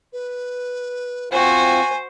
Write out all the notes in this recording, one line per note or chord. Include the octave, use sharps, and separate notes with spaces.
B4
C4 F4 F#4 C5 G#5